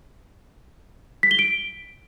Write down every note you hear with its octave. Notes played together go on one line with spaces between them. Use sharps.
B6
G7
D7